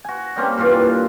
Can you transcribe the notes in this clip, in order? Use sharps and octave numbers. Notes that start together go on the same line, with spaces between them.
F#4 G#5
G3 A#3 C4 C#4
G2 A#2 E3 F4
D4